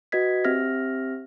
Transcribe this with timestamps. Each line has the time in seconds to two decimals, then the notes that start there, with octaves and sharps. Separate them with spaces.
0.12 F#4 B4 D#5 G#6 B6
0.44 C4 G4 E5 F6 A#6